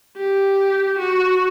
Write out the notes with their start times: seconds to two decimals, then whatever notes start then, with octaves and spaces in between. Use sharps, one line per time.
0.17 G4
0.98 F#4